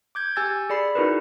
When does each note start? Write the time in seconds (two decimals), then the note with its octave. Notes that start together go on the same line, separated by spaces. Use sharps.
0.15 D6 G6 G#6
0.36 G4 G#5 E6 G#6 A6
0.70 G#4 D5 B5 C7
0.95 D#4 E4 F#4 G#4 A#4 B4